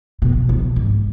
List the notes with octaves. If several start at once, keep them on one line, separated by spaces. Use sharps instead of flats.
B2
B2
G#2